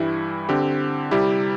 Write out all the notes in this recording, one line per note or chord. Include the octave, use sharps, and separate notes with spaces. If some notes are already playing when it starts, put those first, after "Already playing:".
Already playing: G2 E3 G3 E4
D3 C4 G4
C3 G3 E4 G4